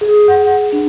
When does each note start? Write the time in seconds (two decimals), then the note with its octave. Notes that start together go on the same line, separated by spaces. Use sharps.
0.01 G#4
0.28 F#5
0.73 D4